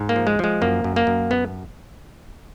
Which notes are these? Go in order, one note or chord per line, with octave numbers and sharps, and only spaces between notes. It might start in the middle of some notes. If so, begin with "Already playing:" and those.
Already playing: G#2
A#3
F3
G#3
F3 G#3
F#2 A#3
F#2
A#3
F#2
B3